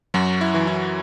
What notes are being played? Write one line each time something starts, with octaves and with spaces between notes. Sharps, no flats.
F#2 F#3 F#4
E4
E3
E4